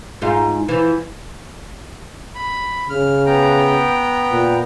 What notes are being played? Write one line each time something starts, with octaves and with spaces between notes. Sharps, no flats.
G#2 D#4 F4
E3 F3
B5
C#3 F6
B3 G5 A#5
A#2